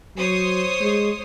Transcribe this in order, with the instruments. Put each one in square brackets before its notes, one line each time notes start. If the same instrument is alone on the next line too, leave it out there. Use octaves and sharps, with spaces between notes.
[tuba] F#3 [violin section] C5 C#5 D#6
[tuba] G#3